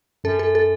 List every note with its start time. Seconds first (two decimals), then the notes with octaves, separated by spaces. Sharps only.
0.24 F#2 A4
0.39 A4
0.55 A4